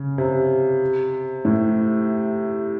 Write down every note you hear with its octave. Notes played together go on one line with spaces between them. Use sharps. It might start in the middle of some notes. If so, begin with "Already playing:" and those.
Already playing: C#3
C3
A2